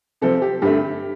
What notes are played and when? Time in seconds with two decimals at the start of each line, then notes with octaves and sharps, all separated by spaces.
0.21 C3 F3 C4 A4
0.42 G4
0.62 G2 D3 A3 G4